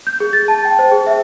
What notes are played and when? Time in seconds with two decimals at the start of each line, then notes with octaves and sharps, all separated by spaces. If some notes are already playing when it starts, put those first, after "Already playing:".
0.07 G6
0.20 G#4
0.33 A6
0.48 A5
0.65 G5
0.79 C5
0.92 G#4
1.07 E5